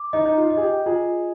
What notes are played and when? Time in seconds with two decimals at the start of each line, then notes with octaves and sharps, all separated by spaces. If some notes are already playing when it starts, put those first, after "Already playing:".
Already playing: D6
0.13 D#4 D#5
0.25 D#4
0.38 F4
0.50 D#5
0.57 G#4
0.62 G4
0.86 F4 G#4